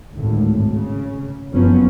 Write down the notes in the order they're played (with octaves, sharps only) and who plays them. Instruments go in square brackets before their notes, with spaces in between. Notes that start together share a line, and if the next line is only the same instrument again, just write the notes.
[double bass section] G#1 D2 A2
C#3
F#1 F3 F#3 B3 C#4